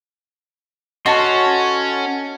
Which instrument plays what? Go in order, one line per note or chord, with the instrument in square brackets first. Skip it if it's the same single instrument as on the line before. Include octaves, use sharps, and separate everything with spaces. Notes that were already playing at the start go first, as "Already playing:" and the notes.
[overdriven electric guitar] C#4 [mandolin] F#4 [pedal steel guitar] A4 C#5 C6 [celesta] D#5 A5